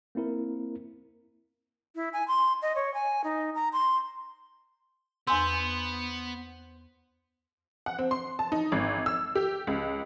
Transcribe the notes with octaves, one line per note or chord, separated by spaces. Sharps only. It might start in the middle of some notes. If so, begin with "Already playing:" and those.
A#3 C4 E4 A#4
E4
G#5
C6
D#5
C#5
G#5
D#4
A#5
C6
E2 B3 C5 G#5 E6
F#5
C4
C6
A5
D#4
G#1
E6
G4
C#2